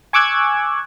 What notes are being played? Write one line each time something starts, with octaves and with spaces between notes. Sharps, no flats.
G#5 C#6 D6 E6 F#6 G#6